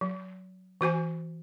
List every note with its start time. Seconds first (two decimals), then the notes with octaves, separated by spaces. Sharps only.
0.01 F#3
0.81 E3 F#4 C5 G#5